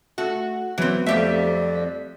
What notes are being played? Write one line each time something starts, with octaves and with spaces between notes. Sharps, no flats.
A3 F#4
E3 F#3 B3 C4
F2 G3 A3 C4 F4 G4 D5 E5
B6